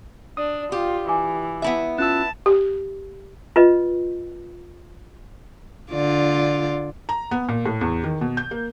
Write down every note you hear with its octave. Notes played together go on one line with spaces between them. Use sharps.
D4 D#6
F4 G4
E3 G#5 D6
B3 E4 E5
C#4 F4 A5 E6 F#6
G4
F4 B4 D#5
D3 F4 D5
A#5
B3
A#2
A2
E2
D#3
B2
G6
A#3